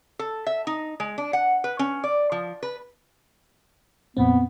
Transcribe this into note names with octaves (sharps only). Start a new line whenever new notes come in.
A4
E5
D#4
G#3
D4
F#5
B4
C#4
D5
F3
B4
F2 A#2 B3 C4